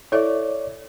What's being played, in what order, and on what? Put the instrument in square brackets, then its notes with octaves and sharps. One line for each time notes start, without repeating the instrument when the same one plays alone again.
[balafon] E4 A4 E5 [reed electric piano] C#5 D5